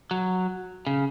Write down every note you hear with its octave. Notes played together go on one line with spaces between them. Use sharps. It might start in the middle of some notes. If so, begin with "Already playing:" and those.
F#3
C#3